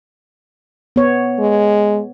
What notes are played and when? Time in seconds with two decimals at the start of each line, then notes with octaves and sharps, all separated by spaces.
0.96 B3 C#5
1.39 G#3